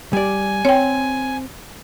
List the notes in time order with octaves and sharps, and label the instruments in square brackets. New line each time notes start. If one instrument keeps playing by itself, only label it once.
[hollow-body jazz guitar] G3 D5 [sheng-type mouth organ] G#5
[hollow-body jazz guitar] C4 [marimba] C#5 G5